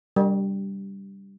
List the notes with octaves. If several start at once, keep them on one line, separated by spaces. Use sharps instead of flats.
G3